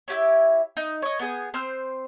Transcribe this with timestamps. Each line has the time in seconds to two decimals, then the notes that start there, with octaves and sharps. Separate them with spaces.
0.08 E4 F4 G4 C#5
0.77 D#4
1.02 C#5 D#5
1.19 B3 G#4 G6
1.54 C4 C5 F6 G6